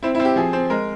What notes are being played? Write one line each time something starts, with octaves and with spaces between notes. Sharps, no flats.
C4 E4
E4
C4
G4
F3 G#4
C4
G#3 A#4